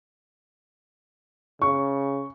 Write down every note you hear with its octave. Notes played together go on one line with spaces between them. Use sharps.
C#3 C#6